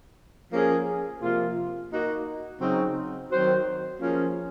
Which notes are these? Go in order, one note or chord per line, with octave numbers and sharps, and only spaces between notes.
F3 A#3 C#4 G#4
C3 F3 A#3 F4
A#3 D#4 F#4
C#3 F#3 C4 D#4
D#3 F#3 C4 F#4 C5
F3 A#3 C#4 F4 G#4